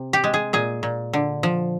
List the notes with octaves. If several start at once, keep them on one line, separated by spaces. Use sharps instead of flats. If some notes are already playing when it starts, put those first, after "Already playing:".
Already playing: C3
G4
G#3
G#4
A#2 G#4
A#2
D3
F3